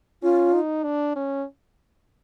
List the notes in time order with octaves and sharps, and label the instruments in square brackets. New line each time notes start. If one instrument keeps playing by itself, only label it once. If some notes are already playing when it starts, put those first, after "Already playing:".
[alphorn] C#4 [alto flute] F4
[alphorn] D#4
D4
C#4